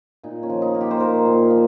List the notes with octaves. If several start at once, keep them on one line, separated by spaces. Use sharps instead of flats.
A#2 D#4
C#4
F3
D#4
A#3
G4
C5
A#2 A#4
A#2
F3